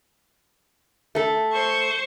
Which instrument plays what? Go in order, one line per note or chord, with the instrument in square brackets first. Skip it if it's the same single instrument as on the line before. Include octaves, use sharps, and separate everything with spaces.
[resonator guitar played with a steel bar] A3 A4
[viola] C5 C#6